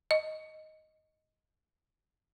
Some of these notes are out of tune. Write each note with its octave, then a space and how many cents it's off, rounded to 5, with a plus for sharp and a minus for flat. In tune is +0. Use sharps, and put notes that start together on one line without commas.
D#5 +5